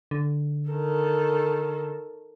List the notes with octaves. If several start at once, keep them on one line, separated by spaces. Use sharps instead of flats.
D3
D#3 A4